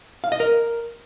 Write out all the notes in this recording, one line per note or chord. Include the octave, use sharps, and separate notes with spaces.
F5
D#5
A#4